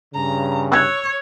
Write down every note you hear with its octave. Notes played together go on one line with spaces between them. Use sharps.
G2 C#3 A#5
C#5 E6 F#6 G#6